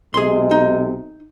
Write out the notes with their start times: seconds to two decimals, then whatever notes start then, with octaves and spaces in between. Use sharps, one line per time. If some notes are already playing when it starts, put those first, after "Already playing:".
0.14 B1 C3 G#3 G#4 C6
0.51 D#4